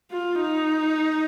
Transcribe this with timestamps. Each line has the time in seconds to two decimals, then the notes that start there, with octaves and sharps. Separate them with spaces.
0.11 F4
0.41 D#4